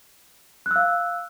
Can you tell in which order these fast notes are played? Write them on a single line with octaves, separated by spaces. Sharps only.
F#6 E6 F5